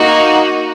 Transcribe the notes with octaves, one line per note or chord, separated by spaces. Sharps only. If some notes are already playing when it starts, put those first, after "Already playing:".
Already playing: A#3 D#4 F#4